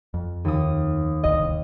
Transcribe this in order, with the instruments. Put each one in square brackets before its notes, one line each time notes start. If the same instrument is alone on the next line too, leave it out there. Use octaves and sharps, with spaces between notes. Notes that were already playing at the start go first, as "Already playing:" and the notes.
[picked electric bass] F2
[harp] D#2 D#6
[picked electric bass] D1 G1 C2 [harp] D#5